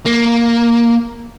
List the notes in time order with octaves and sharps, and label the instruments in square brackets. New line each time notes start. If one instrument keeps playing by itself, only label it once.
[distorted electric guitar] A#3